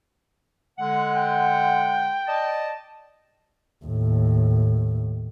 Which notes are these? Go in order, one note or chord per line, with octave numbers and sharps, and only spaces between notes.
D3 G#3 F#5
G5
D5 D#5 A5
D#2 A2